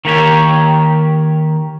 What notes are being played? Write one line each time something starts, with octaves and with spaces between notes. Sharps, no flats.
D#3 A#3 G4 C#5